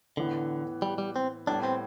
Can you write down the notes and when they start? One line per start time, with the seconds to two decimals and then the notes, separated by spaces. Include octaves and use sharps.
0.17 A2 D3 E3 B3
0.82 G3
0.98 G3
1.16 C4
1.47 A2 G3 B3 D4
1.63 C4